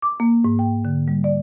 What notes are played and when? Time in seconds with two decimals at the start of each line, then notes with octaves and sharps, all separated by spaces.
0.02 D6
0.20 A#3
0.45 G#2
0.59 G5
0.85 D3
1.08 G3
1.24 D5